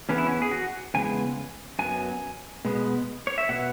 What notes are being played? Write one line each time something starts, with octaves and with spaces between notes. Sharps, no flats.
E2 E3 B3 C#4
E4
C#4
G#4
F#4
E2 C#3 G#3 B3 G#5
F#2 F#3 B3 G#5
B2 G#3 B3
C#5
E5
B2 B3 F#5